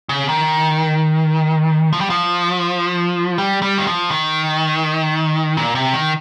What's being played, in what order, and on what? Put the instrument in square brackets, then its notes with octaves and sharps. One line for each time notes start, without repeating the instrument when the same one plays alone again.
[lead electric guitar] C#3
D#3
F3
G3
F3
G3
G3
D#3
F3
D#3
A#2
C3
D#3